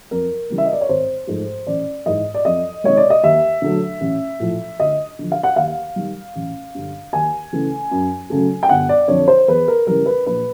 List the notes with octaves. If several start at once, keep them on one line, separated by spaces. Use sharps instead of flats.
F2 A#4
C#3 E3 G3
E5
D#5
D5
C#5
G#1 C5
G#2 F3 A3
A1 D5
G#2 E3 D#5
D5
F2 D#5
C3 D#3 G#3 C#5
D5
D#5
D#2 E5
D3 F#3 A3
A1
A2 F3
D2 D#5
D3 F3
F5
F#5
D#2 F5
D#3 G3
A1
G2 D3
D#2 G#5
C#3 E3 A3
F#2
C#3 F#3 A3
G5
G1 F#5
D5
F2 D3 C#5
C5
E2 B4
A#4
C#3 E3 G3 A#4
B4
A#1 B4